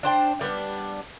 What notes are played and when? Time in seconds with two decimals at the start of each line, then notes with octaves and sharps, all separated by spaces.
0.03 D4 C5 G5
0.41 G3 B3 D4